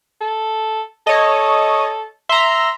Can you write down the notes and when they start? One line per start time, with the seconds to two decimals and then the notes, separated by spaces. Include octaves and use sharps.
0.21 A4
1.07 A4 C#5 D#5
2.29 E5 A#5 C6